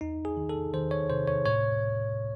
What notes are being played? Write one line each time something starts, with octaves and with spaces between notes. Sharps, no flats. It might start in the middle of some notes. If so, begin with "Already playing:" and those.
E2 D#4
G#4
D#3
A4
D#3 C5
C#5
C3 C5
C#5
A2 C#5